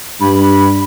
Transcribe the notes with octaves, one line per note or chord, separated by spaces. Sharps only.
G2 B5